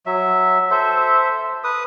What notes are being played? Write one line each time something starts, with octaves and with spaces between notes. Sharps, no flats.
F#3 E5
A4 C5 E5
B4 D#6